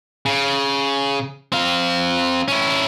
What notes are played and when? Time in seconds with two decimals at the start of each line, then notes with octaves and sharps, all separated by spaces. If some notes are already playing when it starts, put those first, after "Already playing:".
0.26 C#3
1.52 C4 F5
2.48 C#4 E4